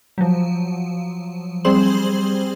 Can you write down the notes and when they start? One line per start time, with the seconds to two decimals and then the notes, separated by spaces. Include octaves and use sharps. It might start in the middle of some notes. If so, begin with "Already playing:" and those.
0.18 F3 F#3
1.65 G3 C4 G#4 C5 C6 F#7